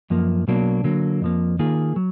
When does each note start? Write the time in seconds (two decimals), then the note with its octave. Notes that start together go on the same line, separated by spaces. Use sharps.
0.10 F#2 F3 A#3
0.48 B1 B2 F#3 A#3 D4
0.84 D3 F#3 A#3
1.21 F2 F3 A#3
1.59 D#3 A#3 F4 G#4
1.96 F#3